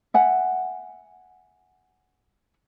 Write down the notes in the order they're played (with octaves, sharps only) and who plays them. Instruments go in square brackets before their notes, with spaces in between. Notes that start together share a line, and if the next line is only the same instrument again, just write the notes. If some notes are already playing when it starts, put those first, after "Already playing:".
[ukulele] E5 F#5 G#5